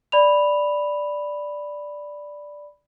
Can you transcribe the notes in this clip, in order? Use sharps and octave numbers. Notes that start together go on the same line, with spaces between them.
D5 B5 F7